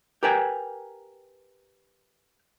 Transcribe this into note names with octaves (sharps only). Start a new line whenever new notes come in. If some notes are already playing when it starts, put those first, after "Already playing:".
G4 A#4 B4 G5 G#5